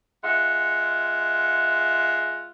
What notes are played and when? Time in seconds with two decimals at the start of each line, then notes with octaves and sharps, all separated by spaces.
0.24 G#3 F4 E5 F#5